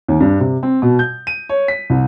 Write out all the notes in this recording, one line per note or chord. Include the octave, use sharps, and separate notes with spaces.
D#2
G2
C3
C4
B2
G6
D#7
C#5
B6
C2